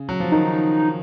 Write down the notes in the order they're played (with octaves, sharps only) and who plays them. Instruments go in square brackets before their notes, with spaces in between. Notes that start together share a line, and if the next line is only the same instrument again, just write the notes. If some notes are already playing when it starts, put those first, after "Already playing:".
Already playing: [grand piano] C#3
F#3
F3
[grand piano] D#3 [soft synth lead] D#4